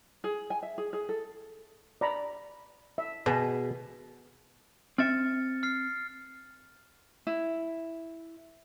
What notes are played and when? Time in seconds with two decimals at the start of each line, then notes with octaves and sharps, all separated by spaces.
0.24 G#4
0.50 G#5
0.63 E5
0.78 G#4
0.93 G#4
1.09 A4
2.01 D5 A#5 B5
2.98 E5
3.26 B2 G#4 B4
4.98 C4 E5 F6 A6 C#7
5.63 F6 C7
7.27 E4